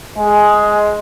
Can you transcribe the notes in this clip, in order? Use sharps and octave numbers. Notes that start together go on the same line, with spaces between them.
G#3